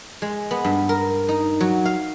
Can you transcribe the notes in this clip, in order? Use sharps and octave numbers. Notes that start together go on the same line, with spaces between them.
G#3
B3
G2
A#4
D#4
F#3
F5